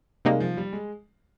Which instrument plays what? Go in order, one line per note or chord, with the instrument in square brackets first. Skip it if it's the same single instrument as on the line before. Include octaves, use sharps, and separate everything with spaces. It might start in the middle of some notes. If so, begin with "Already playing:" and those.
[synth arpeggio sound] C3 G3 A#3 D#4 [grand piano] G#3
[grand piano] F3
G3
G#3